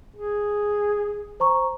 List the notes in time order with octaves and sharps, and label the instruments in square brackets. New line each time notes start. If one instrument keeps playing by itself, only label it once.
[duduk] G#4
[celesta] C5 A#5 C#6